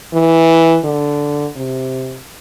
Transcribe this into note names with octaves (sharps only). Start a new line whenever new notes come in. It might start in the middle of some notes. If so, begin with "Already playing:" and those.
E3
D3
C3